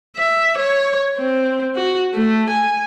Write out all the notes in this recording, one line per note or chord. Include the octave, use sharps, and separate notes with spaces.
E5
C#5
C4
F#4
A3
G#5